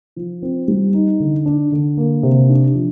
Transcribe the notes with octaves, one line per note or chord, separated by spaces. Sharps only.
F3
C4
G3
D#4
D3
D4
D3
A#3
C3
D4
F3